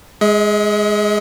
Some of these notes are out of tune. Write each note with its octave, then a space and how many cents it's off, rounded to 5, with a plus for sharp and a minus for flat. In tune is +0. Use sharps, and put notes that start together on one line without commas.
G#3 +0 D#5 +45